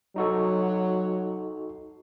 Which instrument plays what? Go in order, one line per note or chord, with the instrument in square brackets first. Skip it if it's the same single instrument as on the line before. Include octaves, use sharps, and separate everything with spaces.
[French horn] F#3 [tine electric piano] D#4 F#4 A4